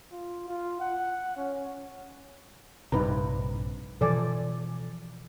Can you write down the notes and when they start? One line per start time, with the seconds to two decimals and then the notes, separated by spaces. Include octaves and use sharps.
0.12 F4
0.48 F4
0.80 F#5
1.36 C#4
2.92 A#1 G2 C3 D#4 B4 A#5
4.01 B2 E3 F3 A4 D5 G#5